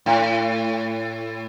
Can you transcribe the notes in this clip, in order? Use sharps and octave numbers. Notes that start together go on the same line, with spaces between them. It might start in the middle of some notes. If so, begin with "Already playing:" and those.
A2